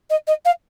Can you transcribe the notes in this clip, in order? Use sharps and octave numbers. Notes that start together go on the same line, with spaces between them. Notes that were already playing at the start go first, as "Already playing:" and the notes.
D#5
D#5
F5